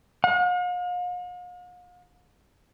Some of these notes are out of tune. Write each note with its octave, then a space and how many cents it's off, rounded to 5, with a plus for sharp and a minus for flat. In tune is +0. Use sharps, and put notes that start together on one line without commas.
F5 +45